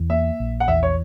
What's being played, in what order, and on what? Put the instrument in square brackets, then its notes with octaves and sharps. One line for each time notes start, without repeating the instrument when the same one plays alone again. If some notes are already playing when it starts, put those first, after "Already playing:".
Already playing: [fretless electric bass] E2
[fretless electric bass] A#3 [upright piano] E5
[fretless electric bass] A#1
[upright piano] F#5
[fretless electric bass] E2 [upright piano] E5
[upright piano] C#5